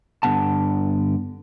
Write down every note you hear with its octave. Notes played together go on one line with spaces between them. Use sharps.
G2 D3 B3 F#5 A5